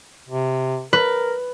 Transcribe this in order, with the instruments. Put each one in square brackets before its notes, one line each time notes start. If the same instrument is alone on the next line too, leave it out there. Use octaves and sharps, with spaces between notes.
[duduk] C3
[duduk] A#4 [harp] B4